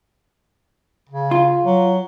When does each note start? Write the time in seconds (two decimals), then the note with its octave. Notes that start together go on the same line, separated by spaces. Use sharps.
1.09 C#3
1.31 F4
1.65 F#3